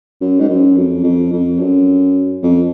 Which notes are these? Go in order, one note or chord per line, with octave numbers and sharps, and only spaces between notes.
F#2
G#2
F#2
F2
F2
F2
F#2
F2